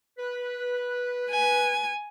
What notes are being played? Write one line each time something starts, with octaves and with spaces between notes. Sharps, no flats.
B4
G#5